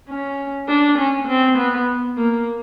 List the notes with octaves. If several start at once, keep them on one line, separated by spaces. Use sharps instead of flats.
C#4
D4
C#4
C4
B3
A#3